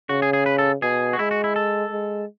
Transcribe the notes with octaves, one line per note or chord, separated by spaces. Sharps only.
C#3 F#4
G#4
G#4
B4
A4
B2 G#4
F#4
G#3 E4
F#4
E4
A4
G#3